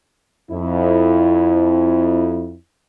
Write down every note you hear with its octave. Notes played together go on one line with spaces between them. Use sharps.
F2 E4